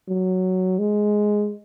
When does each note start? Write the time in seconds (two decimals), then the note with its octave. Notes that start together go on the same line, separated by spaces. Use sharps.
0.08 F#3
0.79 G#3